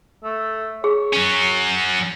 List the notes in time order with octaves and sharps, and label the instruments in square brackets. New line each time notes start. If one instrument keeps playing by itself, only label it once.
[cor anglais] A3
[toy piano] G#4 [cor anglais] C#5
[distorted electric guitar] F#3 C#4